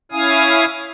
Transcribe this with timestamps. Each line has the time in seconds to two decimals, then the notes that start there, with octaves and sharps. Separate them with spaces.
0.11 C#4 E4 F5 G#5 D#6